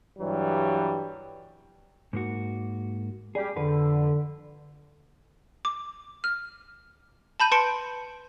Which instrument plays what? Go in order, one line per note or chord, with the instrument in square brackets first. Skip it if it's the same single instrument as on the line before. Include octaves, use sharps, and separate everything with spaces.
[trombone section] G2 E3 F#3 G3
[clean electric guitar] G#2 A#3 F#4
[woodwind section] G3 C#4 G4 [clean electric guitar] G#4
[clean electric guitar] F2 F3 B4 [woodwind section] D3
[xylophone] D6
F6
A5 B5 G6 D#7
B4 A5 C6 C#7 D7